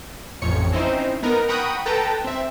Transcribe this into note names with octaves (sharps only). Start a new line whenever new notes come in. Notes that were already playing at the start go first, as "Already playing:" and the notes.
A1 F2 C#5 C#7
C4 C#4 D#4 E4 C5
B3 D#4 A#4
F#5 G5 A#5 B5 C#6 D#6
A4 B4 G5 A5 A#5
C4 E5